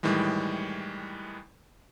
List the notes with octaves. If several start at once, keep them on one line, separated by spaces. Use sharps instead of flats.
A2 D#3 E3 G3 G#3